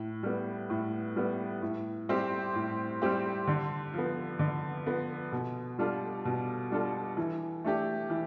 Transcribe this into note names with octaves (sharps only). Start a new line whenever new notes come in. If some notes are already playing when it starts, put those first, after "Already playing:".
Already playing: A2
G3 B3
A2
G3 B3
A2
G3 C4 G4
A2
G3 C4 G4
D3
F3 B3
D3
F3 B3
B2
G3 D4 F4 A4
B2
G3 D4 F4 A4
E3
A3 D4 G4
E3